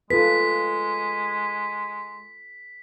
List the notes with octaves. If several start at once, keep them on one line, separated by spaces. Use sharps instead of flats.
G#3 F4 A4 B4 B6